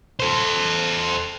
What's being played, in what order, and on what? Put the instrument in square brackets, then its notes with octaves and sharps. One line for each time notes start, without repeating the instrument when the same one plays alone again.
[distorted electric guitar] A4 C5